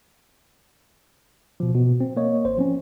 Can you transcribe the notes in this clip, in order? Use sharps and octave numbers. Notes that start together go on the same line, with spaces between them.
B2 F3
B2
C4
A#3 C#5 D#5
G#1 C5
F3 C4 C#4